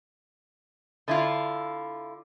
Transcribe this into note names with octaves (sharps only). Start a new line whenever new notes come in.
D3 E4 F4